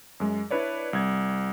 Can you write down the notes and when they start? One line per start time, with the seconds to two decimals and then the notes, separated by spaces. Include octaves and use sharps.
0.20 F#2 G#3
0.51 D4 E4 B4 C#5 D5
0.93 C2 G#6